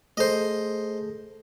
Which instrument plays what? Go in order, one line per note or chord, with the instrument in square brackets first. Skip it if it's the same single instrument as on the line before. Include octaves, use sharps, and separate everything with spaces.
[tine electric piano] A3 G#4 A4 [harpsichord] C5 D#5